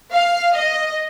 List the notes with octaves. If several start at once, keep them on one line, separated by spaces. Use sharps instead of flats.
F5
D#5